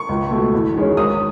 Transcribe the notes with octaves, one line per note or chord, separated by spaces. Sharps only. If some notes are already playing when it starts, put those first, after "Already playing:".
Already playing: C#6
C#2
B2 A3
E2
D#3 G#3 C#4
G#1 D#6